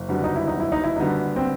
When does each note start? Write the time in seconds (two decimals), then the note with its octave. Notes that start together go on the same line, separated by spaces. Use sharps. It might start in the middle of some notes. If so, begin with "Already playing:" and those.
Already playing: F#1
0.09 F#2 D3 G3 B3
0.24 D#4
0.36 E4
0.47 D#4
0.54 F#1
0.60 E4
0.72 D#4
0.84 E4
0.96 F#2 D3 G3 B3 D#4
1.36 C4